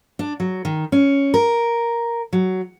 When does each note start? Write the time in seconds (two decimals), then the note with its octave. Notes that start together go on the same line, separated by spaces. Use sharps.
0.19 D4
0.40 F#3
0.65 D#3
0.92 C#4
1.34 A#4
2.33 F#3